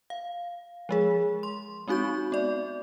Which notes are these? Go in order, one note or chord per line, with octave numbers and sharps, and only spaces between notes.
F5
F3 G#3 G#4
C6
G#3 C4 D#4 F#4 C#6 G6
B3 D5